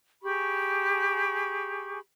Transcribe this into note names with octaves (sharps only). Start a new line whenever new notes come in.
G4 G#4 B5 C#6